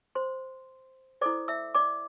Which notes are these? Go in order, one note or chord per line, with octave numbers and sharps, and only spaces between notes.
C5 C6
E4 A4 C5 D5 D6
E5 E6
D5 D6